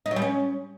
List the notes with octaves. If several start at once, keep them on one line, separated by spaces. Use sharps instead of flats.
D#4
F#3
G3
C#4